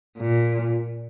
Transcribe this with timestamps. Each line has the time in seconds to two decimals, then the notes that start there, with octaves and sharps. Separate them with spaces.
0.18 A#2